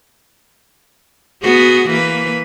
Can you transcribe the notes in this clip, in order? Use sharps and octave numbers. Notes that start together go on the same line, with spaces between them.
B3 F#4 G#4
E3 A#3 B4